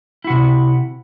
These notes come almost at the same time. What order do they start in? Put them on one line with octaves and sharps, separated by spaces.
E4 F#4 C3